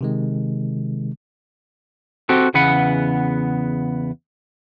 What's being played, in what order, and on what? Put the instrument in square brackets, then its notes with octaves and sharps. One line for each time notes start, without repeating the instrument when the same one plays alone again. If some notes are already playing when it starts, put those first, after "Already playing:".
[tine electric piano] C3 D#3 G#3
[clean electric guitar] C4 F#4 G4 A4
E2 C#3 B3 B4 F#5